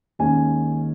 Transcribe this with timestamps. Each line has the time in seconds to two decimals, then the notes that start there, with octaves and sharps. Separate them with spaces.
0.19 D#2 D#3 G#3 C#4 G#5